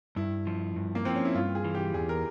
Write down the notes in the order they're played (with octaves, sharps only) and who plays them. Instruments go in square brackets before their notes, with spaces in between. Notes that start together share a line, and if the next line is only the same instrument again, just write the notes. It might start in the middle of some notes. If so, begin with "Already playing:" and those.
[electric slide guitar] G2 [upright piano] E4
[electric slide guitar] F3
G2
[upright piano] A#3
[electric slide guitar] F3 [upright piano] C4
[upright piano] C#4
E4
[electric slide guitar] G2 [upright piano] F4
[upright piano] G#4
[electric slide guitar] E3
[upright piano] G4
[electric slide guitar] E2 [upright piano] G#4
[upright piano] A#4